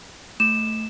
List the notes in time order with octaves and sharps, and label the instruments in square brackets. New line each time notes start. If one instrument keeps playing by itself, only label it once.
[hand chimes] A3 [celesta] E7